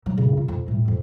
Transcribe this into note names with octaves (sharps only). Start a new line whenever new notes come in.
F#3
G2 C#3
F4
F2
A2 G3
F2